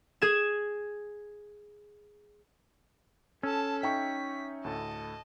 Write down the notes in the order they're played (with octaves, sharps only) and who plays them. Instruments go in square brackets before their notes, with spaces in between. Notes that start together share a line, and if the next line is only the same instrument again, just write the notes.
[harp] G#4 G#6 E7
[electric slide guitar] C#4 [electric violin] A4 A5 [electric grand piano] E6
[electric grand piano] D#4 E5 C#6 [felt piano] G5 [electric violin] B6
[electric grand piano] D2 A2 A4 [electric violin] D#5 A5